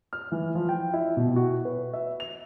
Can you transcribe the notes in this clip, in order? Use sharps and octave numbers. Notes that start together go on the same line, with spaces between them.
F6
E3
F3
G5
E4
B2
F#4
B4
E5
F7